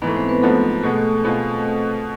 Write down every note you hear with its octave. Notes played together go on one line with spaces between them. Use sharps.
G#2 E3 A3 B3 B4
C4 C5
B3 B4
G#2 F3 A3 B3 A4
B2 G#3 A3 B3 A4
B2 B3 C4 F4 G#4 C5